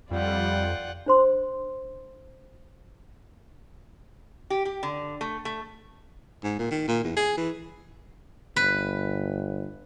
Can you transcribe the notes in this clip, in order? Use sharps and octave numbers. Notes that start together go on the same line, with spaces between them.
F2 G3 F4 D5 F#5 G5
D4 C5 C6
G4
G4
D3
A3
A3
G#2
A#2
D#3
A#2
E2
G#4
E3
G1 B4